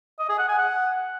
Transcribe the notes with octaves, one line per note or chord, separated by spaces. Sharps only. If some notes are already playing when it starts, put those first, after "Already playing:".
D#5
G#4
F#5
G#5
F#5